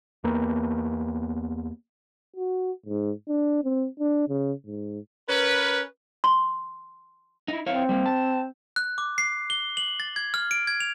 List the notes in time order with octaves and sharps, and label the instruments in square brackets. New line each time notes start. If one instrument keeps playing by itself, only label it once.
[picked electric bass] E2 A#3 B3
[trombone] F#4
G#2
D4
C4
D4
C#3
G#2
[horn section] C#4 A#4 B4
[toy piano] C6
[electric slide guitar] D#4 E4
[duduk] C4 [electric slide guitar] E4 C#5 F5
[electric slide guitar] G3 A#3
A5
[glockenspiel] F#6
D6
C7
G7
F#7
A6
G#6
F6
D7
G#6
F7